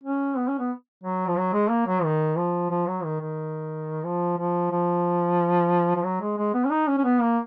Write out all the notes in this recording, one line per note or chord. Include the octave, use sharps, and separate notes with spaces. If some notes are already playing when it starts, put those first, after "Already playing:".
C#4
B3
C#4
B3
F#3
F3
F#3
G#3
A#3
F#3
D#3
F3
F3
F#3
D#3
D#3
F3
F3
F3
F3
F#3
G#3
G#3
B3
C#4
D#4
C#4
C#4
B3
A#3